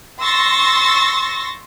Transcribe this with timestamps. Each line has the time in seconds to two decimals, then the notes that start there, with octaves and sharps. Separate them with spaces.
0.21 C6 C#6 E6 A6 A#6